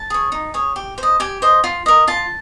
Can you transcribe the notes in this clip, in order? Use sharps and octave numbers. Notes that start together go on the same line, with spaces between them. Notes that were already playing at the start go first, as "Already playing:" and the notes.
Already playing: A5
G#4 C#5
D#4
G#4 C#5
G4
C5
D#5
G4 G#5
C5 D#5
F4
A#4 D#5
F4 A5